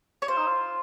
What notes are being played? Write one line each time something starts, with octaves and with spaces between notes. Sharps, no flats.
C#5
F4 C5
D#4
F4